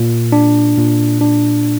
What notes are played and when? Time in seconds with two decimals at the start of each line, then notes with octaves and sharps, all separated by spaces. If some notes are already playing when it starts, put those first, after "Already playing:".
Already playing: A#2
0.32 D4
0.78 A#2
1.21 D4